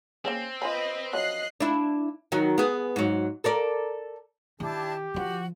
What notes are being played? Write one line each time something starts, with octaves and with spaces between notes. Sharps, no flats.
A#3 C4 C#4 G#4
F4 B4 D#5 G#5 B5
F3 F#3 D#5 F#6 C7
D4 E4
D#3 F#3
B3 G#4
G#2 F#3
A4 A#4 D5
D#3 D4 E4 G4 A5
D3 F3 F#4